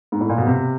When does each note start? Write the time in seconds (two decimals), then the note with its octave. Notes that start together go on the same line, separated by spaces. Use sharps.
0.12 G#2
0.21 A2
0.29 A#2
0.38 B2
0.47 C3